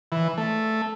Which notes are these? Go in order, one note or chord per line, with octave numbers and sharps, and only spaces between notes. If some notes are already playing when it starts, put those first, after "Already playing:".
E3
A3